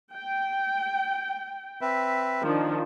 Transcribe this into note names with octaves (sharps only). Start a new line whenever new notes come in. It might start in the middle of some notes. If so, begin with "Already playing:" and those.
G5
C4 B4 E5
D#3 F3 D4